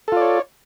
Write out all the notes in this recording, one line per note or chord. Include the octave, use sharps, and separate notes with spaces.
F4 A4 C#5 D5